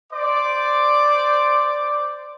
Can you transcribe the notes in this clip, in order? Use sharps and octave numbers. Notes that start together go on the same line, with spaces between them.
C5 D5 D6